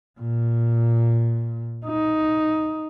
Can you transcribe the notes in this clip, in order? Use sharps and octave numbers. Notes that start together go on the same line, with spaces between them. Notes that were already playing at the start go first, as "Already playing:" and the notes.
A#2
D#4